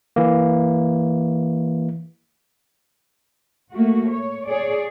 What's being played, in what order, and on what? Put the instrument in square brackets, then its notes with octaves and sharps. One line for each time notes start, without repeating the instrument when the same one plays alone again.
[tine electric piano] E3 A#3
[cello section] A3 A#3 F#4
C#5
G#4 C#5 D5